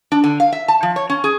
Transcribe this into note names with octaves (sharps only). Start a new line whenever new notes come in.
D4
D3
F5
E5
A5
F3
C#5
C#4
G#4